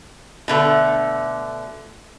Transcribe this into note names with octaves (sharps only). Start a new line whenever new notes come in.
B2 D3 A3